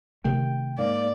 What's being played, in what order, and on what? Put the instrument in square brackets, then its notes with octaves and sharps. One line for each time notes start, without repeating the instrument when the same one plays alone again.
[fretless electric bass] C3 D#3 A3 [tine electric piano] G5
[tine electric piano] G#2 A#3 [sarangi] D5